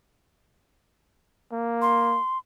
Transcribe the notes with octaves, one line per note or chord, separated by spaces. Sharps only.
A#3
C6